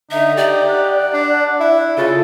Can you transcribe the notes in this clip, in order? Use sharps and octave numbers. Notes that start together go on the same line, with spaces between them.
D3 D#4 E5
G4 D5
F#5
D4
E4
C#3 F4 A4